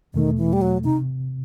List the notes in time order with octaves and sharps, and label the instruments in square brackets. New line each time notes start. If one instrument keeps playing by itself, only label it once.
[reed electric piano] E2 B2 A3 [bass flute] D#3
[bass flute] E3
G3
F#3
[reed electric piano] C3 [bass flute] D#4